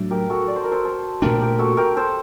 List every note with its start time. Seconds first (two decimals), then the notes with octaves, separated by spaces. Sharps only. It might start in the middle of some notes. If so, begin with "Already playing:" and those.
Already playing: A2 F#3 A3 D4
0.11 G4 A#4
0.30 F#4 A4
0.48 D5
0.56 C5
0.64 A#4
0.72 A4 C5
0.85 A4 C5
1.22 A#2 A3 D4 G4 A#4
1.41 G4 A#4
1.59 F#4 A4
1.77 G4 A#4
1.96 A4 C5